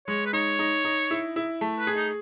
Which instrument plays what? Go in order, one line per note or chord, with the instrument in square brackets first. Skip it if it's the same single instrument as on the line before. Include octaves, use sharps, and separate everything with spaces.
[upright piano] G#3 [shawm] C#5
[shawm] B4
[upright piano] D#4 [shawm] C#5
[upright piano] D#4
D#4
E4
E4
A3
[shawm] B4
[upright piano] G#4
[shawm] D#4